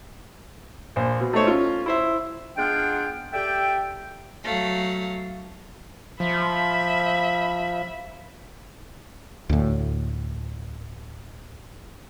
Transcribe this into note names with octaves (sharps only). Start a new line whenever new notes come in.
A#1 C5
B2
A3 D#4 A4 C5 C#5
C#4 F4
E4 C5 E5
G#3 B3 D4 F4 F#5 G5
G4 A4 D5 E5 G5
F#3 A3 F5
F3 E5 B5
D2 A2